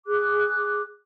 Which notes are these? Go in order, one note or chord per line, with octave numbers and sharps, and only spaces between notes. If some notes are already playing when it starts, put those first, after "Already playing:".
G#4 D6 F#6